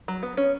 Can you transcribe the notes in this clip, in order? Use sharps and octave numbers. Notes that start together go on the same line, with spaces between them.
F#3
B3
C#4